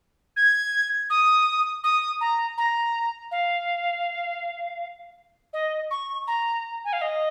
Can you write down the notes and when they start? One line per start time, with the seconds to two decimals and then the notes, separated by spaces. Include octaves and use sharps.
0.36 G#6
1.10 D#6
1.83 D#6
2.20 A#5
2.57 A#5
3.31 F5
5.53 D#5
5.90 C#6
6.27 A#5
6.84 G#5
6.93 F5
7.01 D#5